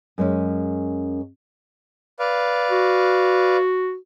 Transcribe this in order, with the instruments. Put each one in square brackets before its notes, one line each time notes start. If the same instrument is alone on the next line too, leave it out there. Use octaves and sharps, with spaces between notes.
[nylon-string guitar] F#2 G#3 C#4
[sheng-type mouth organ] B4 D5 F5
[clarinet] F#4